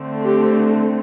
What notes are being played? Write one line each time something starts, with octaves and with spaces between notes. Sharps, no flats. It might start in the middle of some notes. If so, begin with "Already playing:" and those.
Already playing: D3 A3 C4
G4